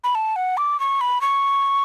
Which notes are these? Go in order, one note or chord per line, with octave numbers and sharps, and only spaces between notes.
B5
A5
F#5
D6
C#6
B5
C#6